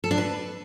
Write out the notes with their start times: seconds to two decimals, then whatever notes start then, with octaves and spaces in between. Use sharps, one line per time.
0.04 A4
0.11 D4
0.18 B4